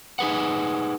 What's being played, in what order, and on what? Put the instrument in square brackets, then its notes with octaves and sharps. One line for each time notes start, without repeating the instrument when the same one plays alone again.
[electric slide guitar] D#4 G#4 B4 F#5